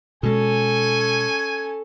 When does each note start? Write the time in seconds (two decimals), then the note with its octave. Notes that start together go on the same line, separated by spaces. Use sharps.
0.23 B2 G#3 C#4 A4 G#5